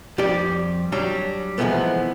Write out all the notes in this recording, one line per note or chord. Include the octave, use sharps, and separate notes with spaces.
F2 G3 G4 D5
F#3 G3 D4
C3 E3 F3 G#3 A3 B3